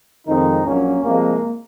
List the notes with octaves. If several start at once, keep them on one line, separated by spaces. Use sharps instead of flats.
F2 D#3 G#3 C4 D#4
A#1 A#2 F#3 A#3 C#4
C2 C3 F3 G#3 A#3